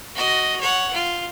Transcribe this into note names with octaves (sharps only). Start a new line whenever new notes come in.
F#4 D#5
C#5 F#5
F4